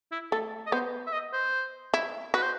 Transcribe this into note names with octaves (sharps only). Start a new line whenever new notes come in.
E4
A3 A4
D#5
B3 C5
E5
D#5
C5
E4
F#4 B4
C5